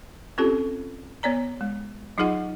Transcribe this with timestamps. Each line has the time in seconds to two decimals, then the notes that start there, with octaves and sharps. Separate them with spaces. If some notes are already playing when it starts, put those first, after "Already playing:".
0.38 C4 C#4 F4 G4 A4
1.23 B3 C#5 D5 A#5
1.61 G#3
2.18 F#3 D#4 F4 G#4 D#5 F#5